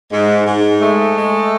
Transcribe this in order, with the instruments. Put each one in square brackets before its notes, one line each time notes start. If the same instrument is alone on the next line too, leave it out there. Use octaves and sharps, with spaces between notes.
[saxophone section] G#2
G#2
G#3 A3
G#3